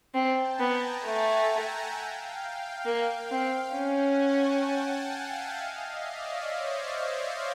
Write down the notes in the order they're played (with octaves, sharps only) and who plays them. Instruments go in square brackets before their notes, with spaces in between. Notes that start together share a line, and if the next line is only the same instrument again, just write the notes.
[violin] C4 [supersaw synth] G5 A5
[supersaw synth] G#5 A#5
[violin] B3
[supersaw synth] G#5 A#5
[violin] A3 [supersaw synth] F#5 G#5
[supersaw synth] E5 F#5
E5 F#5
F5 G5
[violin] A#3
C4
[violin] C#4 [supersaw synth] F#5 G#5
[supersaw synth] G5 A5
F#5 G#5
F5 G5
E5 F#5
D#5 F5
D5 E5
C#5 D#5
C5 D5